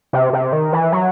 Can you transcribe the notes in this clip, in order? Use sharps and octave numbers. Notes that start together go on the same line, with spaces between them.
C3
C3
D#3
E3
F#3